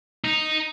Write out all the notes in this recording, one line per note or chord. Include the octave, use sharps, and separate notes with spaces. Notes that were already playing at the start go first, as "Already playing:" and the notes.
D#4